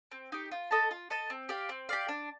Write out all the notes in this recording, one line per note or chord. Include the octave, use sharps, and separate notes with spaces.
C4
D#4 G4
F4
A4 D#5 A5
F4
A4 D#5 A5
C4
G4 D5 F5
C4
G4 D5 F5
D4